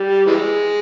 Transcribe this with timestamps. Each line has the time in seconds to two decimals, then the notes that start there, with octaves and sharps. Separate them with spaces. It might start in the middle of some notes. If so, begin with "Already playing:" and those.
Already playing: G3
0.27 E3 G#3